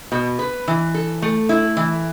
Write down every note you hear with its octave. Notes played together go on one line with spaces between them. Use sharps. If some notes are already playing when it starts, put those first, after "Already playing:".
B2
B4
E3
A4
A3
E4
E3